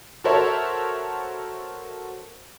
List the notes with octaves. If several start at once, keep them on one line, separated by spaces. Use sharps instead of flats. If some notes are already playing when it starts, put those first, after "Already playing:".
F#4 A4 A#4 C5 C#5 E5